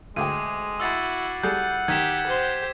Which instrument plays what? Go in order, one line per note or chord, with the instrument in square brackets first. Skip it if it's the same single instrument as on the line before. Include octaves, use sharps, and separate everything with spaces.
[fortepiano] D2 G#4 G5 [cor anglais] G#3 [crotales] D6 D#7
[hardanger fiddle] E4 F#4 [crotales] E6 A6 C7
[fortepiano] G3 G#4 A4 [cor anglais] F#5 [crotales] G6
[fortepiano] D#3 [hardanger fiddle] G4 [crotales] G#6 B6 E7
[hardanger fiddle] G4 C5